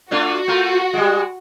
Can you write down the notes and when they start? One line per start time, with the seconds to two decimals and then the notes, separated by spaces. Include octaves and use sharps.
0.11 A3 D4 F4 F#4
0.48 A3 F4 A#4
0.93 G3 G#3